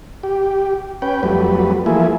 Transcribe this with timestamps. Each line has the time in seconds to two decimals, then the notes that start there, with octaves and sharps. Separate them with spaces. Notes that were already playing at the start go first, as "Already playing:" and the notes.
0.23 G4
1.02 C#4 B4 G5
1.23 F2 F#3 G3 A3 B4
1.86 E3 F3 A3 A#3 E4 G#4